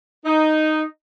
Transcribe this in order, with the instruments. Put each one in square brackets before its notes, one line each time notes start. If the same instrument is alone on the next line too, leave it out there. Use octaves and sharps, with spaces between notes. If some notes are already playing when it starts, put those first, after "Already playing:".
[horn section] D#4